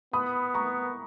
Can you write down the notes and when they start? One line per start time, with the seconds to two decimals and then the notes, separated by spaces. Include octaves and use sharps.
0.13 B3 B5 D#6
0.54 A#5 C#6